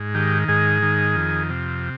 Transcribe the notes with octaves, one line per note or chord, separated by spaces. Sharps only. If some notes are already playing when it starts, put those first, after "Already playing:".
Already playing: G#2
D#3 G4
G#2 G#4
D#3
F2
C3